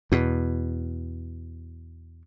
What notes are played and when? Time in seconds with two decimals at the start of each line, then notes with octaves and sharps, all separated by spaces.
0.12 E2 B2